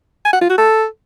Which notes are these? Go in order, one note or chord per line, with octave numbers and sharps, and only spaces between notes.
G#5
F#5
F4
F#4
A4